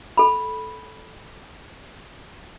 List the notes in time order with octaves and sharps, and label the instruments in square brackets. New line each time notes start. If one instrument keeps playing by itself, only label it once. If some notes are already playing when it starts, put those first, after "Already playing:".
[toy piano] A4 B5